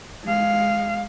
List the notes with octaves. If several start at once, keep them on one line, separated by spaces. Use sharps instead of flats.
G#3 F5